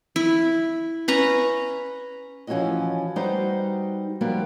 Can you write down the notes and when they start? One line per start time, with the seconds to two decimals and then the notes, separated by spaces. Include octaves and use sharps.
0.16 E4
1.08 C#4 B4 A#5
2.47 E3 F3 C#4 F4 F#4 D#5
3.16 G3 D#4 F#4 B4 C5
4.21 F3 G3 A#3 B3 F#4